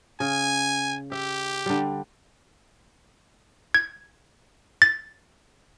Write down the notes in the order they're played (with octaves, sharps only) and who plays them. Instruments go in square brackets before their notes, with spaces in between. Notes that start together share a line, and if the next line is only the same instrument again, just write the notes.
[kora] C#3 [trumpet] G#5
[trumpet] G4 [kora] E5
[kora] D3 G3
[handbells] G#6
A6